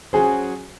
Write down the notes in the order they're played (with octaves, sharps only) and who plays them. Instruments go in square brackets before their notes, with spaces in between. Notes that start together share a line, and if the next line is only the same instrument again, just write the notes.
[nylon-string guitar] F#3 C#4 F#4 C5 [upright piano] G#4